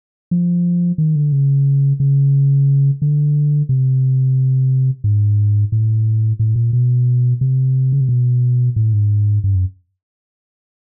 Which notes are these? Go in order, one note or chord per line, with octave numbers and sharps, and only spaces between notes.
F3
D#3
D3
C#3
C#3
D3
C3
G#2
A2
A2
A#2
B2
C3
C#3
C3
B2
A2
G#2
G2
F#2